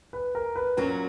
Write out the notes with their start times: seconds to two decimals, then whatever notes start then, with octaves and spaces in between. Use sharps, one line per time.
0.13 B4
0.35 A#4
0.55 B4
0.77 A#2 F#3 A#3 C#4 F#4 A#4